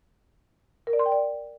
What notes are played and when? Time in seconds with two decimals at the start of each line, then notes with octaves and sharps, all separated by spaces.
0.87 A#4
0.93 D5
0.99 C6
1.06 G5
1.12 D5